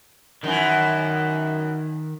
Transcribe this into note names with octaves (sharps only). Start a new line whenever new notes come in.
F#2 D#3 E3